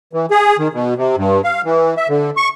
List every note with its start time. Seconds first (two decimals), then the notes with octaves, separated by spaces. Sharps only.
0.13 E3
0.31 G#4
0.59 D#3
0.74 B2
0.97 C3
1.17 G2
1.44 F5
1.64 E3
1.97 E5
2.09 D3
2.37 C#6